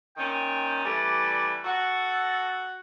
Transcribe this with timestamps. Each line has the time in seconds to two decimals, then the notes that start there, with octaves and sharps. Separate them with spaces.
0.17 A#2 D#3 C#4 G5
0.85 E3 G3 A3 D5
1.65 F#4 A4